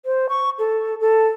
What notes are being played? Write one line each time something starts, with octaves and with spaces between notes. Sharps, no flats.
C5
C#6
A4
A4